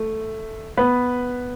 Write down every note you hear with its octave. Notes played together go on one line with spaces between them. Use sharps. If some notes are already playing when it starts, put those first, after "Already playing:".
Already playing: A3
B3 B4